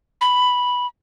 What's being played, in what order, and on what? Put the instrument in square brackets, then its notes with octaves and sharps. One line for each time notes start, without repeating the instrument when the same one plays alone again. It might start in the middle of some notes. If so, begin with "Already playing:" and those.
[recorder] B5